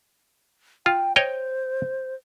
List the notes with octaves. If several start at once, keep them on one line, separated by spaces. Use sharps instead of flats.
F4 G5
C5 C#5 D#5 G5